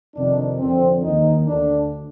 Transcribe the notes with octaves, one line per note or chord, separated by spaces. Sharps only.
F2 C3 D#3 D4
F2 D3 C4
D#2 D#3 D#4
D2 D3 D4